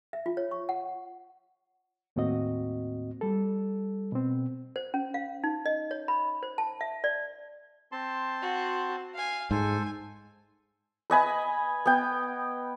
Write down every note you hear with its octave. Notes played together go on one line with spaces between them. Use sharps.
E5
F4
C#5
C#6
F#5
D#2 A2 A#3 C4 F#4 D#5
G3 A4
B2 C4
C5
C#4
F5
D#4
D#5
C#5
B5
C5
A5
E5
D5
C4 A5 C6
F#4
F5 G#5
G#2 A4 C5 G#5
B4 D#5 G#5 B5
B3 G5